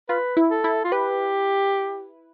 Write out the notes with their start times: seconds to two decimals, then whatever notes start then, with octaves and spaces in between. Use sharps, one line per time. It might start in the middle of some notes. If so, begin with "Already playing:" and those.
0.09 F4 B4
0.37 E4
0.50 A4
0.64 E4
0.84 F4
0.92 G4 B4